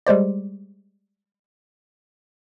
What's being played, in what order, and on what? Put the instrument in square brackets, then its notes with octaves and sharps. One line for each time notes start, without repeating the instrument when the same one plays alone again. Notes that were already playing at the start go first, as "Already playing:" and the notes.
[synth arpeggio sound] G3 G#3 C5 D5